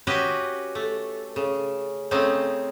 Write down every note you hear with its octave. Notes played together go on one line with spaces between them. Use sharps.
C#4 F#4 G4 B4 D#5
A3
C#3
C#3 A3 C4 C#4 D#4